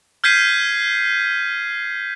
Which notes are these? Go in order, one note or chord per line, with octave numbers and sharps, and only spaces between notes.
F6 G6 G#6 B6 C7 D#7